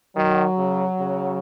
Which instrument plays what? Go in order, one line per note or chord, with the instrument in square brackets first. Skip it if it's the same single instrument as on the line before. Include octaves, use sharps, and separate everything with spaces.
[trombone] D#3 [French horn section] F#3
[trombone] C#3
C#3